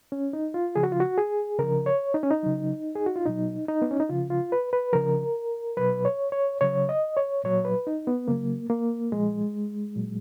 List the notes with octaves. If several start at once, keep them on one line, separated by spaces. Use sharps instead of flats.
C#4
D#4
F4
C#3 F3 G#4
F#4
F4
F#4
G#4
C#3 F3 A#4
C#5
D#4
C#4
D#4
C#3 F#3
G#4
F#4
F4
B2 F#3 D#4
D#4
B3
C#4
D#4
C#3 F3 F4
F4
B4
B4
C#3 F3 A#4
B2 F#3 B4
C#5
C#5
C#3 F#3 C#5
D#5
C#5
A#2 F#3 C#5
B4
D#4
B3
C#3 F#3 A#3
A#3
A#2 F3 G#3
A#2 F#3